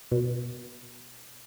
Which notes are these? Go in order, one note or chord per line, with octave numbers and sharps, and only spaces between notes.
B2